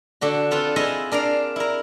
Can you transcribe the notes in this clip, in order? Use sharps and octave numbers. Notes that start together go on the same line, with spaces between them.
D3 D4 F#4
C4 F4 A4 B4
E4 F4 G#4 D#5 E5
D4 A#4 D5 F5
E4 A#4